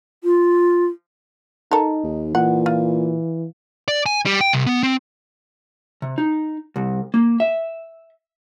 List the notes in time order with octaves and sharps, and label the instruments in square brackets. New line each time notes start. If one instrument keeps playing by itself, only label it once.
[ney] F4
[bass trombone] D#4 [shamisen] A4 A#4
[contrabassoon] D#2
[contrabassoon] A#2 [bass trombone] E3 [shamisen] F#5
[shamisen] F4
[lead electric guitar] D5
G#5
G3
G5
C2
B3
C4
[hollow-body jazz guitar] C3
D#4
C2
A#3
E5